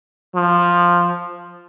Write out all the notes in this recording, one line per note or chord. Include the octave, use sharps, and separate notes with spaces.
F3